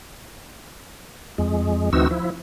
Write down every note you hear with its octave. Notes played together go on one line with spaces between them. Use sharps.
F2 G#3
D2 E3 C4 D#4 F#4 E6
F3 E4